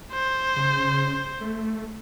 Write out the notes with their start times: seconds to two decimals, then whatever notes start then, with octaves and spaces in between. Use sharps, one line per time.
0.13 C5
0.56 C#3
1.41 A3